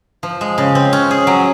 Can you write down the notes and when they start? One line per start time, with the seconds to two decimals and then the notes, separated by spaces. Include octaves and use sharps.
0.23 F3
0.41 G#3
0.58 C#3
0.75 C4
0.93 C#4
1.11 G#4
1.27 F#3